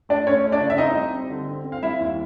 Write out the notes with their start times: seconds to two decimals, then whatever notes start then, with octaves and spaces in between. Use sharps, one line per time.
0.09 A3 D4 D5
0.27 A3 C#4 C#5
0.44 A3
0.52 D4 D5
0.61 C#3
0.70 E5
0.78 C4 D#4 D#5
0.96 G3
1.13 C4
1.30 D3
1.48 C4
1.65 C4
1.72 F5
1.82 G3 E4 E5
2.00 D#2